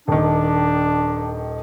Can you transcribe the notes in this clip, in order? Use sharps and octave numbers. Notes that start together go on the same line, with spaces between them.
D#1 D#3 D4